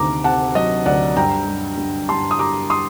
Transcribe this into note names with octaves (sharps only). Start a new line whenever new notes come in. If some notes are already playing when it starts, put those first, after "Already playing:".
Already playing: D2 C3 D#3 A#5 D6
C3 F#5 A5
F#3 D#5
D2 D5 F#5
G2 G5 A#5
G3
G2
G2 A5 C6
D#6
G3 A#5 D6
C6 D#6